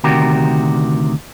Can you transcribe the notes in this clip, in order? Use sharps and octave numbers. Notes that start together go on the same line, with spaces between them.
D2 C3 D#3 F#4 G4 A#4